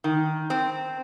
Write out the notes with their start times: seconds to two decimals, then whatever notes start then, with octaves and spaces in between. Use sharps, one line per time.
0.04 D#3
0.50 C4